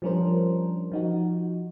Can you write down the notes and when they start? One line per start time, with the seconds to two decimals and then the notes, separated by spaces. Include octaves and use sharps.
0.02 F3 G3 C#4 D4 A#4 C5
0.92 F3 D#4 F#4